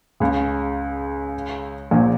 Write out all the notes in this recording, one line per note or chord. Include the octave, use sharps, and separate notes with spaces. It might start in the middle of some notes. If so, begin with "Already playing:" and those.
C#2 C#3
A#1 A#2